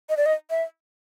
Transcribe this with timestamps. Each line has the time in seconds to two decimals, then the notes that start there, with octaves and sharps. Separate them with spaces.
0.09 D#5
0.17 D5
0.26 D#5
0.50 E5